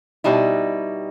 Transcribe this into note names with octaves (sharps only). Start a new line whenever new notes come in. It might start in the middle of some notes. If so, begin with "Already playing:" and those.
B2 G3 D#4 E4